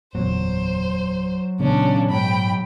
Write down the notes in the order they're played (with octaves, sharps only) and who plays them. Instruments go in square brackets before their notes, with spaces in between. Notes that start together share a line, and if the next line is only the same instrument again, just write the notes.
[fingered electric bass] F#1 E2 A#2 [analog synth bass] F#3 [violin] C5
[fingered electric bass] A#2 E3 B3 [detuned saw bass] C#3 [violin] C#4 D4
[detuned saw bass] G#2 [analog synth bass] F#3 [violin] G5 B5